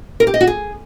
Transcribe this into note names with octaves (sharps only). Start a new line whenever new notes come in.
A#4
G4
D#5
F#4
G#4